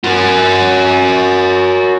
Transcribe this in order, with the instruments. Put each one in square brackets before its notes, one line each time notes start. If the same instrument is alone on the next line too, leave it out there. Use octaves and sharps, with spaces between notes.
[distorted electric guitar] F#4 A#4